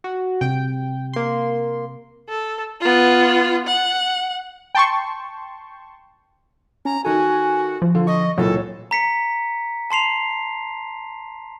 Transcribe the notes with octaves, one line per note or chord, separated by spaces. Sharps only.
F#4
C3 G5
A#3 C6
A4
B3 F4
F#5
G5 A5 C6 C#6
C#4 A#5
D#3 F#4 A4 G#5
F3
D3 F4
D#5 C#6
C#2 A#2 E3 F#3 A4 C#5
A#5 B6 C#7
A5 C6 C7 F7